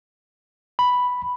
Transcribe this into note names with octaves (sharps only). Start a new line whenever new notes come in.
B5